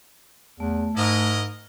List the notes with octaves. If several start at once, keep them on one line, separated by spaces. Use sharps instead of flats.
E2 A3
G#2 E4 A#4 D#5